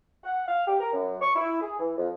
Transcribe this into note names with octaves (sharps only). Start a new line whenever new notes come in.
F#5
F5
G4
A#4
F#2
C#6
E4
G#4
E3
F2